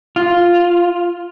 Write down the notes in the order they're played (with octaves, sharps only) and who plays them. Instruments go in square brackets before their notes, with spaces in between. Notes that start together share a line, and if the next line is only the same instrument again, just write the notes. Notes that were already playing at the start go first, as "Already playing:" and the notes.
[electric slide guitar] F4